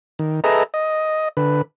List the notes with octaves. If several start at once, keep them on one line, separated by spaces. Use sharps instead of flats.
D#3
G#4 A4 B4 D#5 E5 A#5
D#5
D3 B4